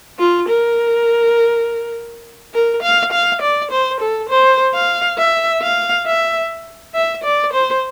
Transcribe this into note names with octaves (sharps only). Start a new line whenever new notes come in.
F4
A#4
A#4
F5
F5
D5
C5
A4
C5
F5
E5
F5
E5
E5
D5
C5